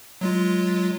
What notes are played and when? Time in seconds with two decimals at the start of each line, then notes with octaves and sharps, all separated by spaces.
0.21 F#3 G#3 F4